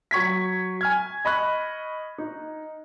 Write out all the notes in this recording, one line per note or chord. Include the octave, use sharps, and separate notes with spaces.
F#3 C#6 G#6 B6
G#5 F6 G#6
D#5 B5 C#6 F#6
D#4